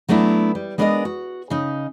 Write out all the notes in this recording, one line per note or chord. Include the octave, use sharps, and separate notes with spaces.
F#3 A3 B3 D4 E4
G3
G#3 B3 D4 A#4 D5 D#5
F#4
C#3 D#4